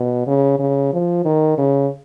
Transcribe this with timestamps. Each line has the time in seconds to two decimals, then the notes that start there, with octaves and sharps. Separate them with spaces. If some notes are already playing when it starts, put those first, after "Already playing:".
Already playing: B2
0.27 C#3
0.59 C#3
0.93 F3
1.25 D#3
1.58 C#3